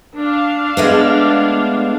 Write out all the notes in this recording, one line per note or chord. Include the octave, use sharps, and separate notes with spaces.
D4 F5
G#3 A3 B3